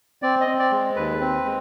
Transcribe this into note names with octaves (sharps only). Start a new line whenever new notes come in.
C4 D5
D#5
C4
D5
G#3
D#2 B4
C4
G#3